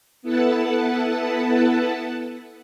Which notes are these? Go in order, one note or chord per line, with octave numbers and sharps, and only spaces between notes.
B3 E4 A4 B4 F#5 A5